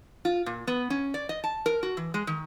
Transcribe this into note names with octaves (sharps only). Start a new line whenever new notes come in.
F4
A#2
B3
C#4
D5
D#5
A5
A#4
F#4
E3
G#3
D#3